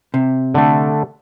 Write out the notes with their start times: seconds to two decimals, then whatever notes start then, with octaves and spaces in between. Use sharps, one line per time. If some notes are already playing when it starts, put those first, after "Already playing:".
0.14 C3
0.54 D3 A3